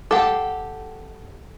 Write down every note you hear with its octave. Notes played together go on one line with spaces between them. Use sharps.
G4 A4 F#5 D6